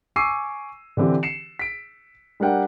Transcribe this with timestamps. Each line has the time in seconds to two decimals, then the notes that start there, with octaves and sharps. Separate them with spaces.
0.16 G#5 C#6 D6 E6 C7 D#7
0.97 D3 E3 C4 G4
1.23 C7 C#7 E7
1.59 B6 D7
2.40 G3 D4 A#4 F#5 G5